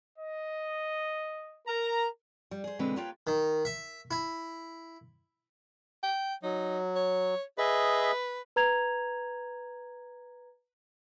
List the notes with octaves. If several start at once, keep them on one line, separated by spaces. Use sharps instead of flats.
D#5
A#4 A#5
G3
G#4 C5
B2 D3 E3 G#3 C4 B4
A#3 F4 G4 B4 C#5 G5
D#3
E5
E4
G5
F#3 D#4
C#5
G#4 B4 D#5 E5
B4 A#5 G#6 F7